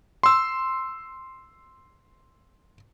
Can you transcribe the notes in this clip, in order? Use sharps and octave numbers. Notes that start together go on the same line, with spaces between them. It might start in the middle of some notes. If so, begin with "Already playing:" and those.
C6 E6